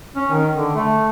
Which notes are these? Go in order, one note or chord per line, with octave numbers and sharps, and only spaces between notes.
C#4
D#3
D3
A3